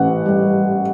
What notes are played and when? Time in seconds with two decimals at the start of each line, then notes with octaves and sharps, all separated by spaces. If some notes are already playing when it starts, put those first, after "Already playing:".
Already playing: A1 F#5
0.26 G3